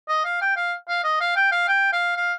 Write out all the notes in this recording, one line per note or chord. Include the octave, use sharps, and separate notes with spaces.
D#5
F5
G5
F5
F5
D#5
F5
G5
F5
G5
F5
F5